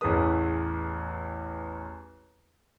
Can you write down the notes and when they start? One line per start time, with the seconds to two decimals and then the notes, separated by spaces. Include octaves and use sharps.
0.01 A1 E2 A3 G#4 B4 D#6